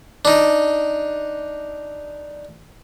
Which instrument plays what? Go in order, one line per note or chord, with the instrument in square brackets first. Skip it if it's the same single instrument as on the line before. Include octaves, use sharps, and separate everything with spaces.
[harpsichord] D4 D#4